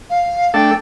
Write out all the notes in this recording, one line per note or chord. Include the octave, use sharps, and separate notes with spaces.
F5
A3 D4 A4 G5